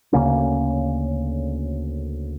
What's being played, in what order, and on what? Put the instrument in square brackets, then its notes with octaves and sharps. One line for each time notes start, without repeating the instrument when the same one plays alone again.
[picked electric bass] D2 C#3 A#3 C#4